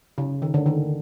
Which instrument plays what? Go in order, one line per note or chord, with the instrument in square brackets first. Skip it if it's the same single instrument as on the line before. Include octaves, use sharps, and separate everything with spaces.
[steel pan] C#3
D#3
D3
D#3